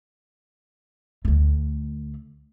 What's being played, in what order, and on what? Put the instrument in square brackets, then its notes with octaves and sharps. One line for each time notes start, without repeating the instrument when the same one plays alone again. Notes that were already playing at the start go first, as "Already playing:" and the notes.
[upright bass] D2 A3